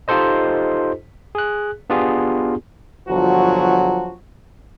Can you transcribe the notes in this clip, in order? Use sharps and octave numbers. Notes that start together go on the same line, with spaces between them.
D#4 F4 G4 A4 C5 D#5
G#4 F#6
B3 D4 F4 G4 G#4
G1 F3 F#3 F#4